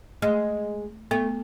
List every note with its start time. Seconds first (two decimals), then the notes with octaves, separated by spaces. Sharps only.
0.22 G#3 A3
1.11 A3 B3